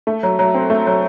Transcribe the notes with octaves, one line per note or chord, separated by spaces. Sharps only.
A3
F#3
F#3
C4
A3
F#3